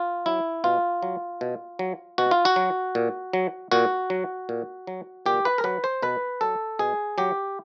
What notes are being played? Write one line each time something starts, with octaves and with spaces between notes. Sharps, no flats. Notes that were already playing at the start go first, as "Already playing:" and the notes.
Already playing: F4
F#3 E4
B2 F4
F#3
B2
F#3
B2 F#4
F4
F#4
F#3
A#2
F#3
A#2 F#4
F#3
A#2
F#3
A#2 G4
B4
A#4
F#3 B4
C5
B2 B4
F#3 A4
B2 G#4
F#3 G4